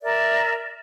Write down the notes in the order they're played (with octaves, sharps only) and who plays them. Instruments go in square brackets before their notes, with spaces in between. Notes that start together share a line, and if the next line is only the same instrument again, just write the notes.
[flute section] A#4 D5 E5